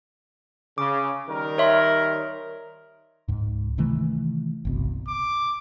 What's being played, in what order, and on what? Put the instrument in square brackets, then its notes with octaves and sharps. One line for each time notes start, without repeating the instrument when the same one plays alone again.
[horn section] C#3 [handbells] D6
[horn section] D#3 G3 A#4
[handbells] C#5 E5 C6
[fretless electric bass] C#2 G#2
C3 D#3 E3 A3
G1 C2 B2
[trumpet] D6